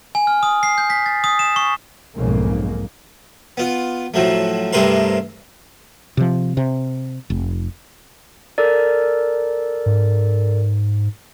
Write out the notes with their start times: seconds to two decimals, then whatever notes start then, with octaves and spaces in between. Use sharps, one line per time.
0.15 G#5
0.27 F6
0.43 D#6
0.63 C7
0.78 G6
0.90 B6
1.06 A6
1.24 D#6
1.39 E7
1.56 C#6
2.15 B1 F2 G#2 C#3 G#3 A#3
3.57 B3 F4
4.14 A2 F3 F#3 A3
4.73 G2 C3 A3 A#4 B4 C6
6.17 C3 F3
6.57 C3
7.30 F1
8.58 A4 A#4 D5
9.86 G#2